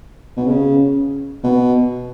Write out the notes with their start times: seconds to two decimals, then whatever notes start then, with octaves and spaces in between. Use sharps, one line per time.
0.37 B2
0.47 C#3
1.44 B2